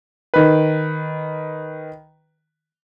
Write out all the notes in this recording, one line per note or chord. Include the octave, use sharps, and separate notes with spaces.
D#3 B4